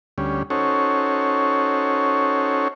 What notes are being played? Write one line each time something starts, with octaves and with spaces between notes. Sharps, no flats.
D2 G3 C#4
C#4 D#4 F#4 A4 C5 C#5